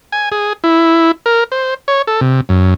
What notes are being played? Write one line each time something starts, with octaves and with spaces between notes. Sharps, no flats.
G#5
G#4
E4
A#4
C5
C#5
A4
C3
F#2